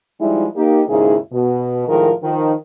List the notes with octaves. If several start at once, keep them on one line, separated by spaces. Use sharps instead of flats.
F3 G3 G#3 D#4 E4
A#3 D#4 G4
D#2 G#2 C#3 D#4 E4 G#4
B2
A2 D#3 F3 G#3 A#4
D#3 F3